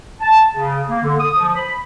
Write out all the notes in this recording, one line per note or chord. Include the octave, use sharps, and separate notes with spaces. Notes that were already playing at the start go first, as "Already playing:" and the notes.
A5
C#3
A#3
D3
D#6
F3
B5